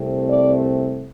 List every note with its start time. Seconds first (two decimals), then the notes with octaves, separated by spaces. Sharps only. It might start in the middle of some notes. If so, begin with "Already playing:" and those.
Already playing: C2 C3 A3 C4
0.25 D5